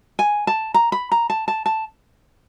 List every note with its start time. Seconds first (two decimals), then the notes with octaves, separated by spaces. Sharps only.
0.19 G#5
0.47 A5
0.74 A#5
0.92 B5
1.12 A#5
1.30 A5
1.48 A5
1.66 A5